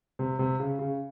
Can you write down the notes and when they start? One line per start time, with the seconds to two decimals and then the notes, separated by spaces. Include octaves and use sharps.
0.19 C3
0.39 C3
0.60 C#3
0.79 C#3